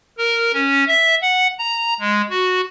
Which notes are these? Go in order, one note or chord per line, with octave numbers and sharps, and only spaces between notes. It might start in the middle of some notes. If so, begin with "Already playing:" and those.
A#4
C#4
E5
F#5
A#5
G#3
F#4